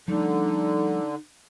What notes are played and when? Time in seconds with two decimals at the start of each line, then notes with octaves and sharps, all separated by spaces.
0.08 D3 F3 G3 A3 D#4